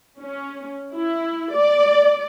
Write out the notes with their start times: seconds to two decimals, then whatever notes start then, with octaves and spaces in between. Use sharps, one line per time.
0.21 C#4
0.93 E4
1.55 D5